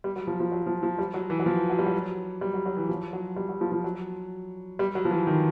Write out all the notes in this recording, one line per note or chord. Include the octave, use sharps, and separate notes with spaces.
G3
F#3
F3
F3
F#3
F3
F3
G3
F#3
E3
F#3
F3
F#3
G3
F#3
G3
F#3
F#3
E3
F3
F#3
G3
F#3
F3
F3
F#3
G3
F#3
F3
E3
D#3